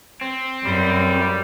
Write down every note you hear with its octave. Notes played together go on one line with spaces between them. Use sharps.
C4
A1 F#2 G3